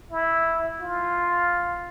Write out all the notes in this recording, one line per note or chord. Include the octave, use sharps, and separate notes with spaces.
E4
F4